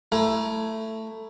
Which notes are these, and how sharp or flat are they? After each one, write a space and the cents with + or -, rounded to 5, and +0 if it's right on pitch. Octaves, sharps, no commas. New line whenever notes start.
A3 +10 E4 +10 A#5 +25